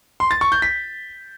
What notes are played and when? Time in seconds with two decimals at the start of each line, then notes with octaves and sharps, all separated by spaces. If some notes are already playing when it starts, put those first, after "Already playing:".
0.20 C6
0.31 A6
0.41 C#6
0.52 G6
0.62 B6